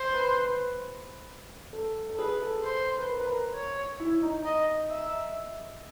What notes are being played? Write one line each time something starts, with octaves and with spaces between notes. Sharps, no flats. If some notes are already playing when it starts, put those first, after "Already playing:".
Already playing: C5
B4
B4
A4
A4
G#4 B4
A4
C5
B4
A#4
B4
A#4
C#5
E4
D#4
D#5
E5